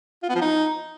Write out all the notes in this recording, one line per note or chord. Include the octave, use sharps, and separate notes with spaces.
F4
B3
F3
D#4